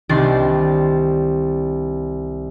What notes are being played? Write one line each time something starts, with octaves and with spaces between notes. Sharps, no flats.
C2 D#3 D4 C6 A6